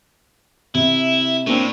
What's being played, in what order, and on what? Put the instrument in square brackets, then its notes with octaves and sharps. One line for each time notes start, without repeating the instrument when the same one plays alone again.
[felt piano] C3 [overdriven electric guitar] E4
[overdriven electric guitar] A2 [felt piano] A#3 C4 D4